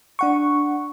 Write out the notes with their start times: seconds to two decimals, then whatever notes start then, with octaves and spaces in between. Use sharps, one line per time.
0.19 D4 F#5 C#6